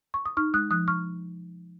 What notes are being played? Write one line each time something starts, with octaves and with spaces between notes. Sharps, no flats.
C#6
D#6
D#4 C#6 F6
G#3 D#6 F#6
F3 D#6 F#6
C#6 F6